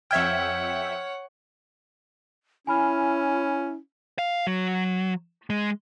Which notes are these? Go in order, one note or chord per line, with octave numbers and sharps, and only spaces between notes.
F2 C#5 E5 F#5 G5 F6 G#6
C#4 E4 G#5 B5 F6
F5
F#3
G#3